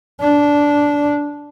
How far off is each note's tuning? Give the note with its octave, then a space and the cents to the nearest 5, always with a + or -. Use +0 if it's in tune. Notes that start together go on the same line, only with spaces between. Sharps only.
D4 -10